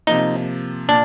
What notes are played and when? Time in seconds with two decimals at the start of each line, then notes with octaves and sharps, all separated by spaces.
0.07 C3 F3 A#3 D#4
0.89 A#2 D4